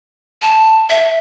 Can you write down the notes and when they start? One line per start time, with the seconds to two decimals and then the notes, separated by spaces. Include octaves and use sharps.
0.42 A5
0.90 E5